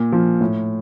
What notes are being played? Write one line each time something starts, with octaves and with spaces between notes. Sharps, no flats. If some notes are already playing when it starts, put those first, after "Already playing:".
Already playing: A#2
F3
A2